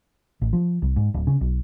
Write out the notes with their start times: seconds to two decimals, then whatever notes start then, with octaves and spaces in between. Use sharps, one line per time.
0.41 A1
0.53 F3
0.82 C2
0.96 G#2
1.14 D1
1.27 C#3
1.41 B1